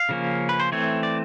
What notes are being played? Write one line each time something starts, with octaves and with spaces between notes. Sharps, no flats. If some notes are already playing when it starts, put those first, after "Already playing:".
Already playing: F5
C#3 F3 A#3 C#4
B4
C5
E3 A3 C4 C#5
D5